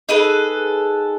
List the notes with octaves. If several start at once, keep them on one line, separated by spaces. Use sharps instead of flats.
D#4 G#4 A4 B4